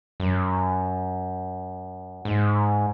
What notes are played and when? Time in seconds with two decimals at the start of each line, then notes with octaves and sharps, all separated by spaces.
0.20 F#2
2.25 G#2